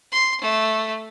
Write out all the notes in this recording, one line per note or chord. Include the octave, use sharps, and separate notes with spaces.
C6
A3